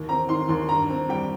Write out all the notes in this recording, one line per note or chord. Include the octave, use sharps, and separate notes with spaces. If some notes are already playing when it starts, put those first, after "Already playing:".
Already playing: D#2
C4 A#5
D#3 C6
D#2 C6
G2 A#5
C4
G3 G5